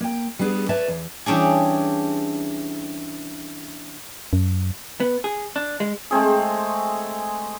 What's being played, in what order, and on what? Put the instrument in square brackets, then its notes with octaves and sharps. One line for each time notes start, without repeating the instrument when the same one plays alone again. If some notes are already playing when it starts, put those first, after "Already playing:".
[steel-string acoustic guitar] A#3 G5
G3 B3 D4 G#4
B4 C#5 D5 E5 A5
E2
[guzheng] E3 G3 C#4 D4 G#4
[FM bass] F#2
[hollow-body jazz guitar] B3
G#4
D4
G#3
[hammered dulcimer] G#3 A3 C4 G#4